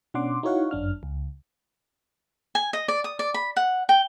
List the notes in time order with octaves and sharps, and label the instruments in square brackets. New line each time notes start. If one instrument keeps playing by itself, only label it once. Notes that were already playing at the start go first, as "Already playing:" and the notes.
[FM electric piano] B2 C#4 D4 F#5 C6 D6
D#4 E4 F#4 C#5 F5 F#5
G1 F#2 D4 F6
C#2
[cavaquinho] G#5
D#5
D5
D#6
D5
B5
F#5
G5